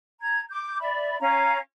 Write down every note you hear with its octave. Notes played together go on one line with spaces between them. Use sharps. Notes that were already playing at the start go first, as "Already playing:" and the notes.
A#5 G#6
D6 G6
D5 E5 B5
C#4 F5 A#5